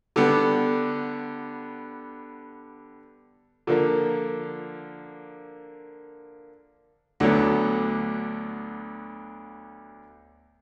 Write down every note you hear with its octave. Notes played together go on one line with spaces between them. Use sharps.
D3 G3 B3
D3 F3 A#3
D2 D3 F#3 B3